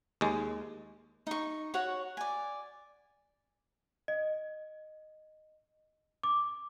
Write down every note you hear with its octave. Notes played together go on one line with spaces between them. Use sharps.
D#2 G#3
D#4 C#6
F#4 C#5 F#5
D5 G#5
D#5
D6